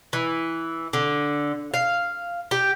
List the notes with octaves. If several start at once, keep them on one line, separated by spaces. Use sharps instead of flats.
E3
D3
F5
G4